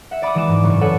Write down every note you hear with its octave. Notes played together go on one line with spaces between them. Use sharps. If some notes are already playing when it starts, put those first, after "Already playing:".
E5 F#5
D5 B5 D6 D#6
E3 G#3 G#5 D6 E7
G#2
F#1 A2 A3 C#6
A4 B4 C#5 D5 F#5 G#5